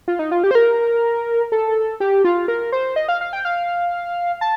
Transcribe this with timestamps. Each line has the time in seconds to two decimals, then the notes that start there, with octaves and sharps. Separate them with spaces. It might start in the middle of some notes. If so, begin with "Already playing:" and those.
0.08 F4
0.19 D#4
0.31 F4
0.44 G4
0.51 C5
0.55 A#4
1.52 A4
2.00 G4
2.25 F4
2.48 A#4
2.72 C5
2.96 D#5
3.08 F5
3.21 F5
3.33 G5
3.45 F5
4.41 A5